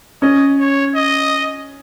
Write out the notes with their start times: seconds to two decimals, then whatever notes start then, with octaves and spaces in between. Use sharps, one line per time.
0.22 C#4 D#5
0.59 C#5
0.95 D#5